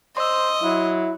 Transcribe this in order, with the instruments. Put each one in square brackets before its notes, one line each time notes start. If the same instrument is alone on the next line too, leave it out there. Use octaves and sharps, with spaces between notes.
[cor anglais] C5 [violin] D#5 [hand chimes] C6 E6
[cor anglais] F#3 [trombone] E4